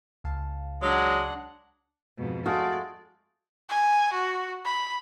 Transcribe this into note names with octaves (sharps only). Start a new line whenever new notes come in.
C#2 F5 A5
F#3 G#3 D4 F#5
F2 G#2 B2
G#3 A3 F#4 D5 F5
G#5
F#4
B5